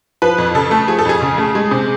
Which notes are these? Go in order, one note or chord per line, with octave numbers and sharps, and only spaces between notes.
F3 B4
F2
C#3 A4
A3
F3 G#4
A4
F2 G#4
C#3
A3
G#3 G#4
C3